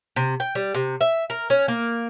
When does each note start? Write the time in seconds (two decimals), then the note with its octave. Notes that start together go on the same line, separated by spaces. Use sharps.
0.16 C3
0.40 G5
0.55 G3
0.75 C3
1.01 E5
1.30 A#4
1.50 C#4
1.68 A#3